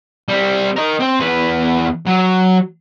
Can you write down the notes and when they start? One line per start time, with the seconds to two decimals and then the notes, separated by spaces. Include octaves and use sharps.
0.28 G3 C4
0.76 A#4 D#5
1.00 C4
1.20 E2 B4
2.06 F#3